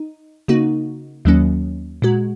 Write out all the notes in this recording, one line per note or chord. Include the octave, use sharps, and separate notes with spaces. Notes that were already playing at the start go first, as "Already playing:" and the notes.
Already playing: D#4
C#3 A#3 D#4 F#4
D#2 D#3 F#3 A#3 C#4
A#2 G#3 F#4